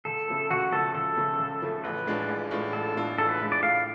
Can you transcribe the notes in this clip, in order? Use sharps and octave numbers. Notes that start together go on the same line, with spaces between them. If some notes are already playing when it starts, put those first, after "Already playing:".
C#2 A4
C#3 F3 A3
C#2 F#4
C#3 F3 A3 A4
C#2 A4
C#3 F3 A3
C#2
C#3 F3 A3
A1 B4
A2 G#3 D4 F4
A1
A2 G#3 D4 F4
A1 A4
A2 G#3 D4 F4
A1 A4
B4
A2 G#3 D4 F4
D5
A2 F5